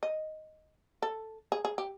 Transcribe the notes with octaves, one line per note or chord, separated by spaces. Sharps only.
D#5
A4
G#4
G#4
G4